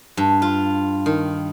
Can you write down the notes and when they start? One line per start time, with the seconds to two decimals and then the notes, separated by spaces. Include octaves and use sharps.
0.17 G2
0.42 F4
1.06 D#3